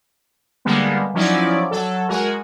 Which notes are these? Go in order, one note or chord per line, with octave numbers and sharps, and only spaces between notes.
D3 G3 G#3 A#3 B3
F3 F#3 C#4 D#4 E4 D5
F#3 A4
G#3 F#4 G#4 A#4